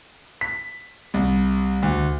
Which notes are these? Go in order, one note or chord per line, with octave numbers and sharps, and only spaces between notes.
B6
C2
D2